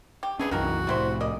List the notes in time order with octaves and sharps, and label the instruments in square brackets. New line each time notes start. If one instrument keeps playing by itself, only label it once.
[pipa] G4
[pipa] A3 B3 D4 [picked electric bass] C#4 [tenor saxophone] G#4
[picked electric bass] C2 F#2 E3 [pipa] D#3 A#3 A#4 [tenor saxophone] F#4
[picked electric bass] C2 A2 [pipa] G3 E4 C5
[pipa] A#3 D5 D#5